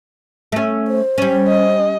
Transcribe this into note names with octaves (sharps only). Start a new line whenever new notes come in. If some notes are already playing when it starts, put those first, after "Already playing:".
A3 C#4
C5
G3 C#4
D#5